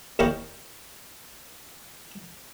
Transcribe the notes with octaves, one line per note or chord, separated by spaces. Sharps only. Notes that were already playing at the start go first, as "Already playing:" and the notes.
D#2 E4 A#4 D5 G5 C#6